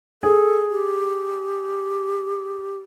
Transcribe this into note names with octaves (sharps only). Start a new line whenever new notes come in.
G#4 A4
G4